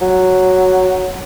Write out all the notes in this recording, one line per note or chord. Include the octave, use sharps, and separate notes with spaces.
F#3